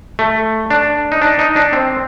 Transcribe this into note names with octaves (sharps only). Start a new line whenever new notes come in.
A3
D4
D#4
D4
D#4
D4
C4